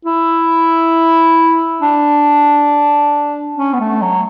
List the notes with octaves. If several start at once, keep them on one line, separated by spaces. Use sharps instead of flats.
E4
D4
C#4
B3
A3
F#3